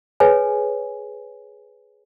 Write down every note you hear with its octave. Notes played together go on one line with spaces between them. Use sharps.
G#4 B4 C#5 G#5